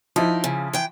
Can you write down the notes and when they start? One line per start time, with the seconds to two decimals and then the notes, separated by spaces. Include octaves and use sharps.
0.16 F3 D#4 E4
0.44 C#3
0.73 E3 G5